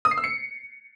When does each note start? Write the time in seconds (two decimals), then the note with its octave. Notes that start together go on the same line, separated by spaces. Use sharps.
0.05 D#6
0.11 C7
0.18 E6
0.24 C#7